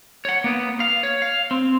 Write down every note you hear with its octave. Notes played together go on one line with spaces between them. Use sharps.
C#5 F#5
A#3 B3
F5
C#5
F5
C4